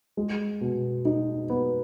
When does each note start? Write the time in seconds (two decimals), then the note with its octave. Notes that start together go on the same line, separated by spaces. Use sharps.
0.17 G#3
0.61 B2
1.05 D#4
1.50 B3